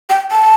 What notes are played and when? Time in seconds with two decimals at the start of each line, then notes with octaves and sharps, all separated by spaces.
0.10 G5
0.31 A5